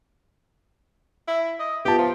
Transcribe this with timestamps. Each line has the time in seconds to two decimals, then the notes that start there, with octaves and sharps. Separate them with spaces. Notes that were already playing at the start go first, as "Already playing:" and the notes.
1.28 E4
1.60 D#5
1.85 B3 F4 G4 A5
1.98 F3